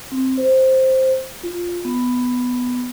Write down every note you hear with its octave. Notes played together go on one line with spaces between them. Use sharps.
C4
C5
F4
B3